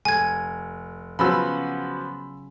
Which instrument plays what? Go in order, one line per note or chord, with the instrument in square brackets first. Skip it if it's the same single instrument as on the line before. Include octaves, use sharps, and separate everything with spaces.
[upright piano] F1 [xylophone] G#5 G#6
[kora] C#3 F#3 F4 [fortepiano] F3 B3 F#4 [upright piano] B5 E6